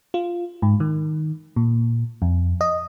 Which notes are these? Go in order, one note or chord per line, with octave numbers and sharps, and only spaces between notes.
F4
G#2
D#3
A#2
F2
D#5